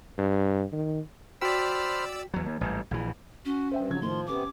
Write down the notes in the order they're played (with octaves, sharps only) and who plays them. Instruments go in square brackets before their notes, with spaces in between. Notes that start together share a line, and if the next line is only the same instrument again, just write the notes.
[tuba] G2
D#3
[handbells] F#4 G5 B6 [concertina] C5 B5 F6 [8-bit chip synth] D5 E6
[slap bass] E2 F#3
D#2
A1 G#2 G3
A#1 E3
[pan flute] C#4 [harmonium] F#4
[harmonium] G2 [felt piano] C5 E5 G5
[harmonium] G#2 F#3 [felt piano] C#3 F3 G#6
[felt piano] A2 D#3 [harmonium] F3 [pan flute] C6
[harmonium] C3 B3 [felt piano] C#4 G4 [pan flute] D6